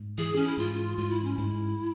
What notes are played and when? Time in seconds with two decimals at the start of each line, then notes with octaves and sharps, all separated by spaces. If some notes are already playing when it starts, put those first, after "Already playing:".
Already playing: G#2
0.18 E3 G#4
0.36 C#4
0.47 E4
0.57 G#2 F4
0.98 G#2 F4
1.10 E4
1.24 C#4
1.37 G#2 E4